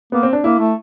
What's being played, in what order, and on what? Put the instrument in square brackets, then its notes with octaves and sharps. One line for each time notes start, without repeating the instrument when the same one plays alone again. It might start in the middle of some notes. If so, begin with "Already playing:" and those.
[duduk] A#3 [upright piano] B3
[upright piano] C4
D4
[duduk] A#3 [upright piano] E4
[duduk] A3